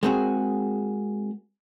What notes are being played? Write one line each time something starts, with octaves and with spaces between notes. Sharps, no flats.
G#3 A#3 C4 F#4 G#4